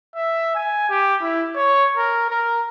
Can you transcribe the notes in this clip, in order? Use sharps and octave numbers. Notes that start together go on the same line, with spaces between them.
E5
G#5
G4
E4
C#5
A#4
A#4